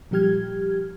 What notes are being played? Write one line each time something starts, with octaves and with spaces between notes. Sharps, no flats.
A#2 F3 G3 G4 F6 G#6